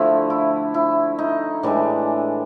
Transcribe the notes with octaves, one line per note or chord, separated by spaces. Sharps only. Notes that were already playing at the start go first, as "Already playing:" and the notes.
Already playing: D3 F3 A3 E4
E4
E4
D#4
A2 E3 G#3 D4